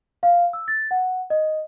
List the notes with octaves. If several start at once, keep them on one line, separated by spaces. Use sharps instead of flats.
F5
E6
A6
F#5
D#5